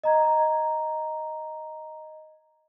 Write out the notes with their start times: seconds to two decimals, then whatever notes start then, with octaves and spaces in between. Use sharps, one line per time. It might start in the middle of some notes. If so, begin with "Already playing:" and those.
0.04 D#5 A#5 G#6